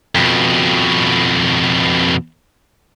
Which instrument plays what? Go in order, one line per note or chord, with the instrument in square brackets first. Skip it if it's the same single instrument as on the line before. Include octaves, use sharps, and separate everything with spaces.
[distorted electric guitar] F2 B2